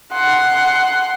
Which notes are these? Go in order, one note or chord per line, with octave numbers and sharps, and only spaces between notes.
F#5 C6